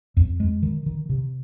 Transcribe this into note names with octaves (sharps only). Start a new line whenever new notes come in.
F2
G#3
D#3
D#3
C3